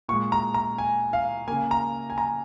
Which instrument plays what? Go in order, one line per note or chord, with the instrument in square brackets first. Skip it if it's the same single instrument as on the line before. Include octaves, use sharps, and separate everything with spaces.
[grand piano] A#2 C#6
G#3
A#5
A#5
G#5
F5
A#3 G#5
C#3
A#5
G#5
A#5